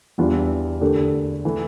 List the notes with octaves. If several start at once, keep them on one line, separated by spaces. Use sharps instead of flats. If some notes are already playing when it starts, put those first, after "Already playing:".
E2 E3 G3 D4 F4
D3 A3 D4 G4 A#4
E3 A3